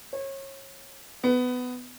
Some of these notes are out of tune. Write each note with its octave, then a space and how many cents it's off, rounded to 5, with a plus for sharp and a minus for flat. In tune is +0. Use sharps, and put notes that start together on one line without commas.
C#5 -30
B3 +15